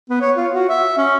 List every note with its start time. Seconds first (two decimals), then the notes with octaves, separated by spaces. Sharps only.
0.10 B3
0.21 C#5
0.37 F4
0.53 F#4
0.69 E5
0.98 C#4